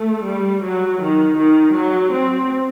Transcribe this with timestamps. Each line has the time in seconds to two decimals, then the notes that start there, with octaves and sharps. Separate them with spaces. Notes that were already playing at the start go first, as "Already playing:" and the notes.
Already playing: A3
0.27 G3
0.64 F#3
1.02 D#3
1.38 D#3
1.75 F#3
2.13 C4